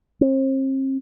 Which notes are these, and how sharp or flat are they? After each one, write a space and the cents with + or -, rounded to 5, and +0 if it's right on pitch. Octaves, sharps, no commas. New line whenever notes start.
C4 +40